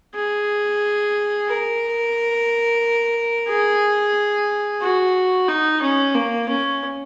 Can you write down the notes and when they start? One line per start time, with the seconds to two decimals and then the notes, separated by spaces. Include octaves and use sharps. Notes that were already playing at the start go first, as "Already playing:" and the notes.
0.15 G#4
1.49 A#4
3.49 G#4
4.82 F#4
5.49 D#4
5.82 C#4
6.15 A#3
6.49 C#4